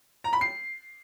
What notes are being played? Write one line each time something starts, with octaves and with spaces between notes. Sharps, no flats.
A#5
B5
C7